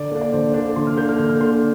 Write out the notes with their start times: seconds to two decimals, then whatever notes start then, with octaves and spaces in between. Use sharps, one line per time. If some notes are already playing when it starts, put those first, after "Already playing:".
Already playing: D3 D5
0.12 A#3 D4
0.21 D5
0.33 D3 C5
0.54 A#3 D4
0.76 D3 C6
0.87 F6
0.97 A#3 D4 G6
1.09 F6
1.18 D3 G6
1.29 F6
1.41 A#3 D4 C6